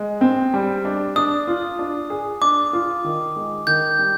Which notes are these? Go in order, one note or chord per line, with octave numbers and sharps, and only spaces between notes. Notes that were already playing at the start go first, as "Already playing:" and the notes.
Already playing: G#3
C4
G3
D4
D4 D#6
F4
D4
G#4
D4 D6
F4
D#3
G#3
D#3 G6
G3